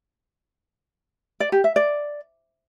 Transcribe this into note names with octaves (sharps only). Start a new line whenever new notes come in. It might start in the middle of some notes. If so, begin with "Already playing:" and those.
D5
G4
E5
D5